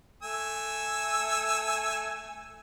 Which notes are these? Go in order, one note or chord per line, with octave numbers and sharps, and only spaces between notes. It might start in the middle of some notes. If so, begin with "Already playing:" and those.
A3 G#5 E6